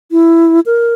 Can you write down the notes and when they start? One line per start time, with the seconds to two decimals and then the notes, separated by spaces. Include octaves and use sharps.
0.11 E4
0.66 A#4